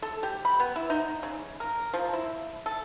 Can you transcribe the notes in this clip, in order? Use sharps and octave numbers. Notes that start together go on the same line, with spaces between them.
A4
G4
B5
B3
E4
D#4
C#3
A#4
F3
E4
A4